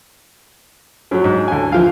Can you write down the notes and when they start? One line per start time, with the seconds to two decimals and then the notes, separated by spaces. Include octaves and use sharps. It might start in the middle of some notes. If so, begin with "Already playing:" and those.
1.11 F#2 F#3
1.24 G#2
1.48 D2 G#5
1.72 E3 F3 F5